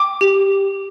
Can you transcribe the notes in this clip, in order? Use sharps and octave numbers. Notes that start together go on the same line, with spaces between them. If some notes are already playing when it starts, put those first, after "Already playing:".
Already playing: G5 D6
G4